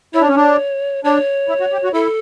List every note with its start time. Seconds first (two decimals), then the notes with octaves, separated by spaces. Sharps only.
0.14 E4 C#5
0.21 D4
0.28 C#4
0.36 D4
1.04 D4 C#5
1.49 E4
1.60 F#4
1.72 G4
1.84 F#4
1.94 E4 A4